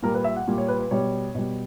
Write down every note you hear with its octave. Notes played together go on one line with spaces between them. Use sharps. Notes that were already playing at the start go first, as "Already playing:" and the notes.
A#2 G3 A#4
B4
E5
F#5
A#2 G3
C#5
B4
B4
B2 G3 C#5
B2 G3